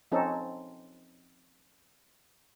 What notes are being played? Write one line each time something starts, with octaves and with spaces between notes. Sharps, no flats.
F3 C4 C#4 D#4 A4